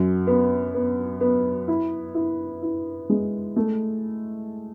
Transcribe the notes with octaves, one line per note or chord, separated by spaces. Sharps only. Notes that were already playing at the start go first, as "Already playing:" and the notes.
Already playing: F#2
B3
B3
B3
E4
E4
E4
G#3
A3